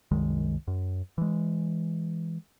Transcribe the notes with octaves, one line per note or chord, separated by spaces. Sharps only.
C2 F#2 D#3 G#3
F#2
E3 G#3